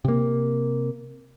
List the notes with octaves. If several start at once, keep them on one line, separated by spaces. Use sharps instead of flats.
C3 A#3